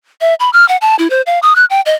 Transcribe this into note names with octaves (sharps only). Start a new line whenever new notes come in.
E5
B5
F6
F#5
A5
E4
C5
F5
D#6
F#6
G5
D#5